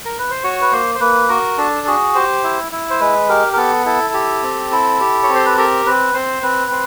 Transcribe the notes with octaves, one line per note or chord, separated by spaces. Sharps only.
A#4
B4
C5
F#4 C#5
B4
A#3 C5
C5
A#3 B4
F#4 A#4
D4 A4
F#4 G#4
G4 C5
E4
E4
C5
G#3 B4
G4 A#4
A#4
B3 A4
E4 A4
G4
C4
E4
G4
C#5
C4
C5
B4
G4 A#4
C4 B4
C4 C5
C4 B4
C4